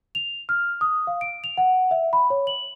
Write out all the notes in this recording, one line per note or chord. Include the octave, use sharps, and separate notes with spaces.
F7
F6
D#6
F5
D7
F7
F#5
E5
B5
C#5
F#7